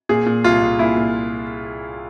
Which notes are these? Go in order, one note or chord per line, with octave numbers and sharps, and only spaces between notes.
A#2 G#4
A#2
C2 F4
C2
A#2 E4
A#2